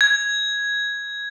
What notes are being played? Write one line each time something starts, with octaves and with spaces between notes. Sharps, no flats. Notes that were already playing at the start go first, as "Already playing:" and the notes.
G#6